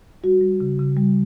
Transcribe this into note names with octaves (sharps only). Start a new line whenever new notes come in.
G3 F#4
G3
C#3
C#3
G3